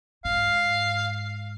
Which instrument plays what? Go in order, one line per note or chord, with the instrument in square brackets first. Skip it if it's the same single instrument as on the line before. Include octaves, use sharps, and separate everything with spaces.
[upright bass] G#2 [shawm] F5